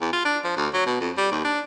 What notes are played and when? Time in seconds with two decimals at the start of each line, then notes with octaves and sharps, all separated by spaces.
0.01 E2
0.13 F4
0.25 D4
0.44 F3
0.57 D2
0.74 F#3
0.86 B2
1.00 F2
1.18 G3
1.31 D#2
1.45 D4